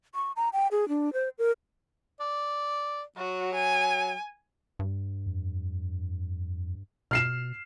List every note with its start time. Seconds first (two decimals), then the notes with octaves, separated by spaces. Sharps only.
0.15 C#6
0.36 A#5
0.53 G5
0.72 G#4
0.89 D4
1.13 C5
1.38 A#4
2.20 D5
3.17 F#3 F#4
3.55 G#5
4.79 G2
5.26 F2
7.11 B2 F6 C7 E7